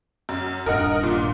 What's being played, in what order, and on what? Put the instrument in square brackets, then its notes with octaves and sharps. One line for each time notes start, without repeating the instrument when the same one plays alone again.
[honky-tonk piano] F#2
[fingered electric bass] D#1 G2 D4 [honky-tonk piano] A#4 D#5 F#5
[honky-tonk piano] A#2